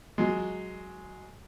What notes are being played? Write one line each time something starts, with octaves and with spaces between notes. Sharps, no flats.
F#3 G#3